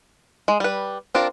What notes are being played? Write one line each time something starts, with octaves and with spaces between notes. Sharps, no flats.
G#3
G3 B4
C4 D4 F4 A#4